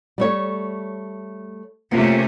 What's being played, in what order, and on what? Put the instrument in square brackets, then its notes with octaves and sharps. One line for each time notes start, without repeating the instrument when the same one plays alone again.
[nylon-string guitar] G3 A3 C#5
[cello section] C3 A3 C#4 [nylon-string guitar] A#3 F4